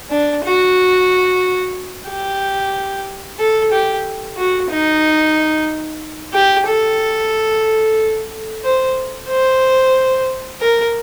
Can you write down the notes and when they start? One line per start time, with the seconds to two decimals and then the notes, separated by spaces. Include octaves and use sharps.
0.10 D4
0.44 F#4
2.08 G4
3.39 A4
3.72 G4
4.37 F#4
4.70 D#4
6.34 G4
6.67 A4
8.64 C5
9.29 C5
10.61 A#4